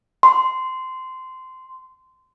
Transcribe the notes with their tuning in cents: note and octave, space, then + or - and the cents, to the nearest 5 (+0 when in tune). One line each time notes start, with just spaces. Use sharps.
C6 -15